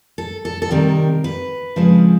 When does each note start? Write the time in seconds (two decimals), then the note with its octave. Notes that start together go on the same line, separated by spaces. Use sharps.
0.18 A4
0.45 A4
0.62 A4
0.71 C3 D#3 G3 C4 A#4
1.24 B4
1.76 C#3 F3 G#3 C4